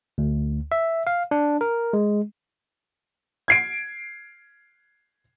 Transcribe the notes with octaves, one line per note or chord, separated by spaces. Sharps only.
D2
E5
F5
D4
A#4
G#3
G#6 C7 D7